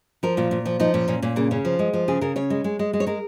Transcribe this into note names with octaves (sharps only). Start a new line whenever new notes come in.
F3 A#4
A#2 F4
A#2
F3
F3 D#4
A#2 C#4
A#2 C#4
A#2 C#4
C#3 A#3
C#3 C#4
F3
G#3
F3
C#3 G#4
C#3 A#4
C#3 C#5
G#3
G#3
G#3
G#3
C#5
G#3 A#4